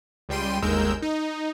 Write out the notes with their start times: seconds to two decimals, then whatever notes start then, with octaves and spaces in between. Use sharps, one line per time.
0.29 C#2 G3 G5 C6 D#7
0.62 G1 D#2 G#3 A#4 E6 G6
1.02 D#4